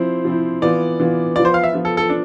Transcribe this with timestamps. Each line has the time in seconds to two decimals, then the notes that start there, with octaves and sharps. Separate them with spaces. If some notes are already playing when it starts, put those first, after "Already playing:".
Already playing: F3 C4 E4 C5
0.25 F3 C4 E4
0.62 E3 B3 F4 D5
1.00 E3 B3 F4
1.35 F3 B3 F4 D5
1.45 C5
1.54 F5
1.64 E5
1.73 F3 B3 F4
1.85 A4
1.97 A4
2.10 D4